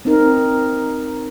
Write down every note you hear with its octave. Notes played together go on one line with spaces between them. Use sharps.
C4 D#4 A#4